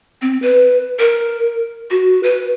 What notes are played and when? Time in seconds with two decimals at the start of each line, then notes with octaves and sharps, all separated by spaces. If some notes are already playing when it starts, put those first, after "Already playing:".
0.22 C4
0.42 B4
0.99 A#4
1.91 F#4
2.23 B4